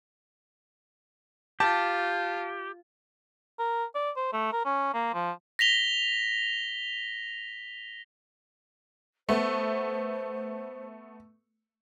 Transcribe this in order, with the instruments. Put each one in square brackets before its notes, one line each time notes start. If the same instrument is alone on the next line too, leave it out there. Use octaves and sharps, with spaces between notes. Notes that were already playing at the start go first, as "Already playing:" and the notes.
[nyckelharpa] F4 [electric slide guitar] G4 [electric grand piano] A5
[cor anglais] A#4
D5
C5
A3
A#4
C#4
A#3
F3
[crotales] A#6 B6 F7 G7
[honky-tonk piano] A3 B3 [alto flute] C5